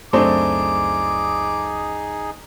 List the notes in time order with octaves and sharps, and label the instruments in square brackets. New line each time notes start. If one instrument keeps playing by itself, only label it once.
[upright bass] C#2 F#2 [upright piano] A3 C4 D4 [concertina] D#4 G#4 [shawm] D6